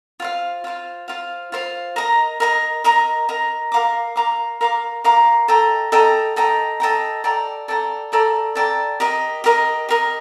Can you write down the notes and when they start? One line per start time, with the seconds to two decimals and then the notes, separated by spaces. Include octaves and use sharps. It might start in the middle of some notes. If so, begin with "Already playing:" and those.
0.20 F4 C5 F5
0.64 F4 C5 F5
1.08 F4 C5 F5
1.52 F4 C5 F5
1.96 A#4 D#5 A#5
2.40 A#4 D#5 A#5
2.84 A#4 D#5 A#5
3.29 A#4 D#5 A#5
3.72 A#4 F5 A#5 D6
4.16 A#4 F5 A#5 D6
4.61 A#4 F5 A#5 D6
5.04 A#4 F5 A#5 D6
5.48 A4 D#5 G5 A#5
5.92 A4 D#5 G5 A#5
6.36 A4 D#5 G5 A#5
6.80 A4 D#5 G5 A#5
7.24 A4 D5 G5 A#5
7.68 A4 D5 G5 A#5
8.12 A4 D5 G5 A#5
8.55 A4 D5 G5 A#5
9.00 G4 A#4 D#5
9.44 G4 A#4 D#5
9.89 G4 A#4 D#5